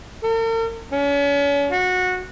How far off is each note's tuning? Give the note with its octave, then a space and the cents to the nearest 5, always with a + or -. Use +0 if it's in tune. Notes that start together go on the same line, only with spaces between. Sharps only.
A#4 -45
C#4 +40
F#4 -15